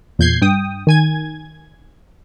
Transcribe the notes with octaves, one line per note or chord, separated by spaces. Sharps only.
E2 A#2 G6 G#6 C7
G2 G5 D#6
D#3 G#5 G#6